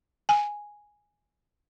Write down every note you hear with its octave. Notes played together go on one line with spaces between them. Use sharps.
G#5